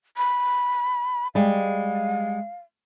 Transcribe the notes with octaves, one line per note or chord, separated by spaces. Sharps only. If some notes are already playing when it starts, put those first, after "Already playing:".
B5
G3 G#3 F5